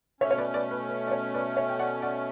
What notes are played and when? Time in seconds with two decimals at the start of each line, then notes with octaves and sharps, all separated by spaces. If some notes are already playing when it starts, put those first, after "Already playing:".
0.21 B2 A3 C#4 C#5 E5
0.31 C#5
0.38 B4 D5
0.54 B4 D5
0.71 B4
0.89 B4
1.07 D5
1.11 A4 C#5
1.34 B4 D5
1.57 C#5 E5
1.69 G5
1.79 D5 F#5
2.02 D5 F#5